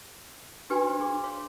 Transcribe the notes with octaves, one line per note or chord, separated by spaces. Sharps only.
D4 F#4 G4 B4 G#5 C6
D4 C5
D4 G#4 C6 D6
C#5 F5 C6 D6